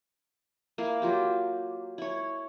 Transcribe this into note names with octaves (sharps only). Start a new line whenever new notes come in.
A#3 E4 F5
F#3 F4 G4
E4 C#5